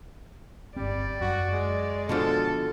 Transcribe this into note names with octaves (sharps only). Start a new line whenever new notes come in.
G1 G3 C4 D5
F#2 F#4
G#3
B2 D3 F3 A4